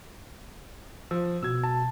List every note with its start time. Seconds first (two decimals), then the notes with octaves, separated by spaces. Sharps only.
1.11 F3 E6
1.43 B2 E6 G#6
1.64 A5